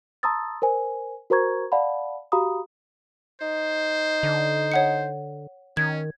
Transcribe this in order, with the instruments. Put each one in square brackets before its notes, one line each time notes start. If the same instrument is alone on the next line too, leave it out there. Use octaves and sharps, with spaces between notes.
[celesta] A5 A#5 C6 D#6 E6 A6
A#4 C5 G#5
F#4 A#4 C5 A#5 C#6 G#6
D5 F5 F#5 A5 B5
F#4 G4 F5 A#5 B5 D#6
[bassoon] D#4 [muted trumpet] C5
[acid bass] D3
[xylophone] C#5 F#5 C#7
[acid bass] D#3 [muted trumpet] C#4 [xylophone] G#6